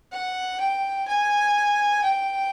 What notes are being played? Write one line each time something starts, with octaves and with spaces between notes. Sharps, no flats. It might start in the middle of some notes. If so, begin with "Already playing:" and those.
F#5
G5
G#5
G5